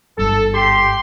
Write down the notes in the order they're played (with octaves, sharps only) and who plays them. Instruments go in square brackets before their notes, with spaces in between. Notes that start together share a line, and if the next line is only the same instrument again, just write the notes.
[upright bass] G1 G#2 [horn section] A4
[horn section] G4 C6